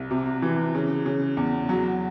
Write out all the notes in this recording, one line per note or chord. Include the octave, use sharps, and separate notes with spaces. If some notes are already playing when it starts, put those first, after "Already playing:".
Already playing: C2
C3
E3
C#3
C#3
E2
F#3